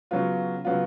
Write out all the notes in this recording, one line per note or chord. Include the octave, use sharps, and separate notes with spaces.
C#3 F#3 B3 F4
C#3 F#3 B3 F4